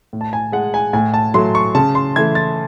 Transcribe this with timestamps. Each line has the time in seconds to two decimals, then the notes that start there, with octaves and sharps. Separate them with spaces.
0.13 A2
0.21 A5
0.33 G#5
0.52 G#3 F#5
0.74 G#5
0.93 A2 G#5
1.14 A5
1.34 F#3 A3 C6
1.55 C#6
1.75 C#3 A5
1.95 C6
2.16 E3 A3 G#6
2.35 A6